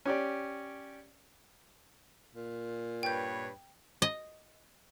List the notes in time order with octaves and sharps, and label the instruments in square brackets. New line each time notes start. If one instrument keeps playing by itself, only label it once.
[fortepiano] C#4 G4 D5
[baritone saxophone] A#2
[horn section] G2 B4 C#5 [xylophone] G5 G6
[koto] D#5